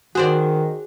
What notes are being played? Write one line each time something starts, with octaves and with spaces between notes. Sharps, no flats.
D#3 F#4 G#4 C5 D5